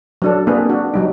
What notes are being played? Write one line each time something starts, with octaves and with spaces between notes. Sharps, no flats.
F#3 D4 A4
A#3 C4 D4 G#4 B4
D4 F#4
F#3 G3 D#4